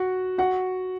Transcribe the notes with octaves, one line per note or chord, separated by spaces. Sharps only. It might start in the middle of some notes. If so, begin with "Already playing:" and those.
Already playing: F#4 F#5
F#4 F#5